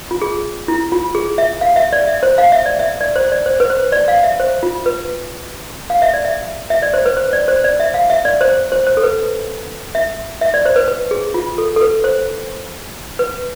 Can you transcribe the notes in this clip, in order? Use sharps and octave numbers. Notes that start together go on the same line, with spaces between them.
F4
G#4
E4
F4
G#4
E5
F5
E5
D5
E5
C5
F5
E5
D5
E5
D5
C5
D5
C5
B4
C5
D5
F5
E5
C5
F4
B4
F5
E5
D5
E5
E5
D5
C5
B4
C5
D5
C5
D5
E5
F5
E5
D5
C5
C5
C5
A4
B4
E5
E5
D5
C5
B4
B4
G#4
F4
A4
A4
B4
C5
B4